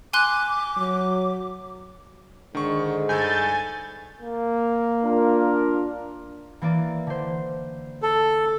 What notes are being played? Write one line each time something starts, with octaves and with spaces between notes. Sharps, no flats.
G#5 C6 D6 F#6
F#3
G#2 D3 D#3 C#6
G2 A4 G#5 G6 A6
A#3
D4 F4 A#4
E3 A#3 D5
D3 C5
A4